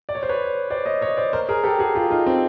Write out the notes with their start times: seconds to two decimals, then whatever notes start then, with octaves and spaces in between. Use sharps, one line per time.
0.09 D5
0.15 C#5
0.23 C5
0.29 B4 C#5
0.70 C5 D5
0.86 C#5 D#5
1.01 C#5 D#5
1.17 C5 D5
1.33 A#4 C5
1.49 G#4 A#4
1.64 G4 A4
1.79 F#4 G#4
1.95 F4 G4
2.11 D#4 F4
2.26 C4